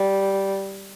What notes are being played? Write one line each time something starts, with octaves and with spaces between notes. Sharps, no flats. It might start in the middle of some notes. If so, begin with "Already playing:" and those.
Already playing: G3